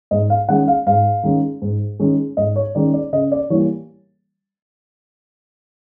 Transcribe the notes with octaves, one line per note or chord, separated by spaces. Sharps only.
G#2 D#5
F5
D#3 G#3 C#4 F#5
F5
G#2 F5
D#3 G#3 C#4
G#2
D#3 G#3 C#4
G#2 D#5
C#5
D#3 G#3 C#4 D5
D5
C#3 D#5
D5
E3 G3 A#3 C#5